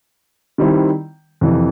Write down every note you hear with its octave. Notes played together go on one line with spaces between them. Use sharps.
D#3 G3 C4 E4
F2 C3 E3